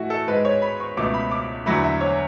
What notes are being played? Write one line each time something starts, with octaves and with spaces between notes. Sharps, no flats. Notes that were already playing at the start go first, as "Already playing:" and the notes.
Already playing: A2 E3 A3 F#4
A4
G#2 G#3 B4
C#5
B5
C#6
C#2 B2 A3 D6
B5
D6
E2 D3 F#3 A3 B5
E5
C#5